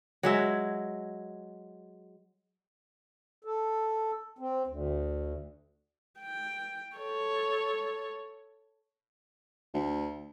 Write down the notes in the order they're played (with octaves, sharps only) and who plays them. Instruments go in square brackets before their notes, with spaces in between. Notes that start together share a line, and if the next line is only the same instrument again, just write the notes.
[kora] F#3 G#3 E5
[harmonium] A4
C4
D2
[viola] G5
A4 C#5
[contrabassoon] D2